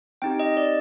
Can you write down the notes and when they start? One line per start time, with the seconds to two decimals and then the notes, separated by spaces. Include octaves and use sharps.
0.22 C4 D#4 G4 G5
0.40 D#5
0.57 D5